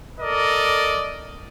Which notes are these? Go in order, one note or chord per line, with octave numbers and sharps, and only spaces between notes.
A4 A#4 D5 D#5